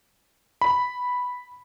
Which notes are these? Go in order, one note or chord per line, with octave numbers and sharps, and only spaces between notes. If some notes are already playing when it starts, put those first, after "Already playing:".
B5